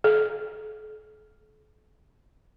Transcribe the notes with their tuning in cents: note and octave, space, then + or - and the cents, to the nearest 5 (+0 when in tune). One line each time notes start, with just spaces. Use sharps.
A4 -45